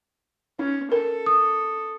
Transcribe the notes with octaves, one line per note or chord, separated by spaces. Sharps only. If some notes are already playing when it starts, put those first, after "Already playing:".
C#4 D#4
A4 A#4
D#6